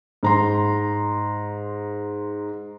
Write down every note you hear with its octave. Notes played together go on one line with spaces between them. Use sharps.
G#2 A#5 C6